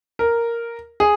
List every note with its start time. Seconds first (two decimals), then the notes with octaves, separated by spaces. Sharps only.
0.19 A#4
1.00 G#4